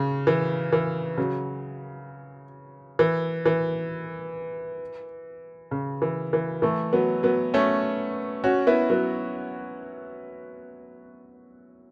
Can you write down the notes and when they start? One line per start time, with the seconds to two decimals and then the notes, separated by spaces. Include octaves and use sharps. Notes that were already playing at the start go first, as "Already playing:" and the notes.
Already playing: C#3
0.27 E3
0.73 E3
1.17 C#3 F#3
2.99 E3
3.46 E3
5.71 C#3
6.02 E3
6.33 E3
6.62 E3 A3
6.93 F#3 B3
7.23 F#3 B3
7.54 A3 C#4
8.44 C#4 F#4
8.67 B3 E4
8.90 F#3 B3